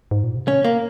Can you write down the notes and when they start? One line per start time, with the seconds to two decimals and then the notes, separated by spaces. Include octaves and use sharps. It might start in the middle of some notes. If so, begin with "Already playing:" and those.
0.11 G#2
0.24 A#2
0.36 C3
0.48 C#3 C#4
0.64 A#3